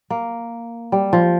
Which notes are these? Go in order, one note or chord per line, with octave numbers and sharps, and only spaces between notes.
A#3
G3
F3